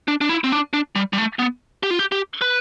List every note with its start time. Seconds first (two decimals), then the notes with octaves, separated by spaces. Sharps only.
0.08 D4
0.21 D4
0.29 E4
0.44 C4
0.52 D4
0.73 D4
0.96 G3
1.13 G3
1.18 A3
1.39 B3
1.83 G4
1.90 F4
1.99 G4
2.12 G4
2.41 B4